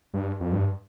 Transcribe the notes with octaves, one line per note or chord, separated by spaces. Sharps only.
G2
F2
G2